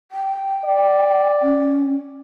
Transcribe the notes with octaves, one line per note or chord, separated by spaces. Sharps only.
G5
D5
C#4